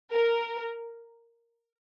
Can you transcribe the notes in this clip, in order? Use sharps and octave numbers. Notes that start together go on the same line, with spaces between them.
A#4